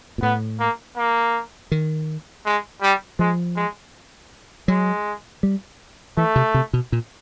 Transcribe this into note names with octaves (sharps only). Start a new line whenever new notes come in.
A#2
A2 B3
A#3
A#3
D#3
G#3
G3
F3 G#3
G#3
F#3 G#3
G3
E3 A3
C3
C3
B2
A#2